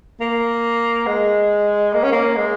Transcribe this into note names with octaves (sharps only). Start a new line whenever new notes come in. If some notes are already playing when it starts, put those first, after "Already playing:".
A#3
G#3
A#3
C#4
A#3
G#3